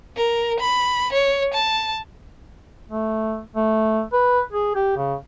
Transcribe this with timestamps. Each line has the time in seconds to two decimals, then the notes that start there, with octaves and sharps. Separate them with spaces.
0.17 A#4
0.60 B5
1.13 C#5
1.54 A5
2.89 A3
3.56 A3
4.13 B4
4.52 G#4
4.75 G4
4.97 C#3